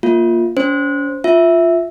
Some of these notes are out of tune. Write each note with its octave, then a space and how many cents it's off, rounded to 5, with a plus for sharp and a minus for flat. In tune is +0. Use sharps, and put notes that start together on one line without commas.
A#3 +0 F4 +0
C#4 +40 C5 +0
F4 +0 E5 +0